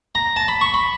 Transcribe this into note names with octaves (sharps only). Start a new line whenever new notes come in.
A#5
A5
B5
C#6
B5